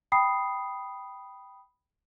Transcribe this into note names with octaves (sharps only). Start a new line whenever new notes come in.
G5 B5 D#6 C7